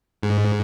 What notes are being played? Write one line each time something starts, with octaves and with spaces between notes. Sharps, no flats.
G#2